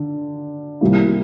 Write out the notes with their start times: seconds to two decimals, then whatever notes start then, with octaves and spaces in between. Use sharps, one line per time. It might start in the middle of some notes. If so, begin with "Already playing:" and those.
Already playing: D3
0.81 C2 C3 G3 A#3 E4